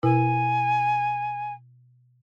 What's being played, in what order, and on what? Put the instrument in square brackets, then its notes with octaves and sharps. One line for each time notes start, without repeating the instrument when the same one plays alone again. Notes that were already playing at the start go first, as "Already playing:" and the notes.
[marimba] B2 E4 A#4 [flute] G#5